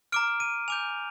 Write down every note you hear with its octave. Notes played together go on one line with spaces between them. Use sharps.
A#5 D6 F6 D7
D#7
G#5 D6 G6 F7